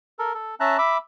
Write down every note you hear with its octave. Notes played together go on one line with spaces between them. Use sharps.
A4 A#4
A4
C#4 E5 A5 A#5 F#6
E5 B5 D6